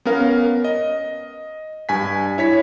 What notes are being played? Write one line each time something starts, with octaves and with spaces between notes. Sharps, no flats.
B3 C#4 A#4 F5
D#5
G2 G#5 B6
E4 C#5 B6